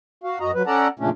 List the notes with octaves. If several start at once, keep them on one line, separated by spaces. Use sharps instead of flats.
F#4 F5
F#2 F#4 D#5 A#5
F#3 B4
C#4 A4 D5 F#5 A5 A#5
F2 A#2 C#3 A3 C#4 D4